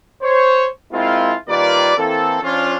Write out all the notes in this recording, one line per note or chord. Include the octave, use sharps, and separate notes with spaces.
C5 C#5
G#3 A#3 C4 E4 F4
D#3 G3 A#3 F4 B4 D5
E3 A#3 C4 E4 A4
F3 C#4 D4 F4